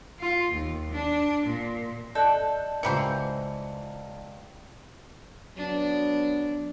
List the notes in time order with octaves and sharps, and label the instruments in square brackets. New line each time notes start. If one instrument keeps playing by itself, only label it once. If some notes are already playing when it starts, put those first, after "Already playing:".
[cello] F4
D#2
D4
A#2
[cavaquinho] A4 [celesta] D5 D#5 A5 [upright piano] F#6 G6
[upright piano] C#2 A#5 C#7 [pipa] E3 G3 C5
[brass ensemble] F#3 B3 [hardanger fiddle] D4